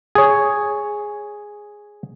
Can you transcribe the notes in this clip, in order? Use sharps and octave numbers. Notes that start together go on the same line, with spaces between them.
G#4 C#5